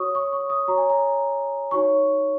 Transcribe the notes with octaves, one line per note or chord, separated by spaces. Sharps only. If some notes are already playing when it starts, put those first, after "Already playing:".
Already playing: F#4 C#5 C#6 D#6
C#6
C#6
D#6
F#4 C#5 A#5
G#5
A#5
D#4 F#4 C#5 C#6